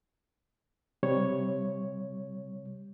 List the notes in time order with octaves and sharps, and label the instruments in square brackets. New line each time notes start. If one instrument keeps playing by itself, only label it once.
[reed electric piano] C3 G3 C#5